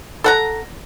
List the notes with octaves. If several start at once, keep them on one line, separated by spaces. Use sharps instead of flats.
A4 F#5 A#5